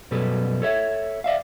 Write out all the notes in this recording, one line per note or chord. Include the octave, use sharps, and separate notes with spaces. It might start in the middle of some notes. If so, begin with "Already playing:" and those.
F#2 B2 G3 A4 B4
A4 C#5 E5
D5 E5 F5